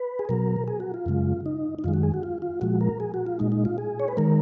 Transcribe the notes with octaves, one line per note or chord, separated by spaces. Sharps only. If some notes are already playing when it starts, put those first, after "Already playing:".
Already playing: B4
G#4
B2 F#3 A#4
G#4
F#4
F4
F#2 C#3 G#3
D#4
D#4
F#2 D#3 G#3 F4
F#4
G#4
F#4
F4
F4
A#2 F3 G#3 F#4
A#4
G#4
F#4
F4
A#2 G#3 D#4
D#4
F4
G#4
C#5
B4
D#3 G#3 A#4